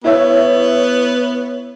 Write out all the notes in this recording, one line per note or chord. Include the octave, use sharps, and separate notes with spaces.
B3 E4 C#5 E5